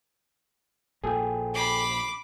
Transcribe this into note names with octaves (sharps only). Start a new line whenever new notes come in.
A#1 A#2 G#4 A4 G5
B5 C6 D6